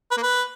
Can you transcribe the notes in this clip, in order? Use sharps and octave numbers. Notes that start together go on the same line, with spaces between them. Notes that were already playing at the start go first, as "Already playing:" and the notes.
B4
A#3
B4